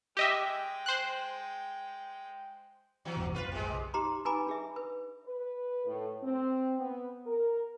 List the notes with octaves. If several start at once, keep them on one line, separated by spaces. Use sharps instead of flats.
G#3 G4 D#5 E5 G5
C5 F#6
C3 E3 F#3
G1 E2 B2
F#1 B1 F4 B4
C3 G#3
D#4 G4 C5 A#5 C6 D6
D#4 B4 G#5 A#5 B5 D6
D4 G#4 E5
B4
B4
A2
C4
B3
A#4